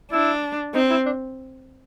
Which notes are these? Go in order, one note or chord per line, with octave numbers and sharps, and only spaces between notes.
D4 E4
C4 D#4
E4
D4